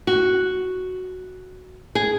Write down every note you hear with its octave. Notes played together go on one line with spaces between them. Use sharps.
F#4
G#4